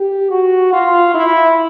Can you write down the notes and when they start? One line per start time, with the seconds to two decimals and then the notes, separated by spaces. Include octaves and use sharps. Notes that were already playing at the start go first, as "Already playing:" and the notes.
Already playing: G4
0.31 F#4
0.73 F4
1.14 E4